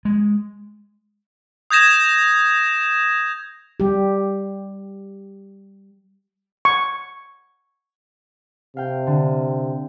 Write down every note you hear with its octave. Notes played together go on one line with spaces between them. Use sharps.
G#3
D#6 G6 G#6 A#6 E7
G3 G4
C#6
C3 F5 G5
D3